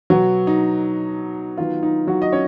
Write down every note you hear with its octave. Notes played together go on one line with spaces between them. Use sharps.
B2 F#3 B3 F#4
D#4
D#3 F#3 B3 F4
D#4
F#3 F#4
D#5
C#4 C#5